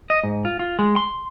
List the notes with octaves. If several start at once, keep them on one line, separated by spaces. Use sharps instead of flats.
D#5
G#2
F4
F4
G#3
C6